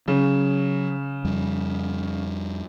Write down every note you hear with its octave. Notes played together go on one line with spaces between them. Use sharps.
C#3 F#3
F2 G3